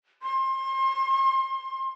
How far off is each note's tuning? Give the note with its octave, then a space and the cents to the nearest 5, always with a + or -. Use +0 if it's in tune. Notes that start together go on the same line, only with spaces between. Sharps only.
C6 +30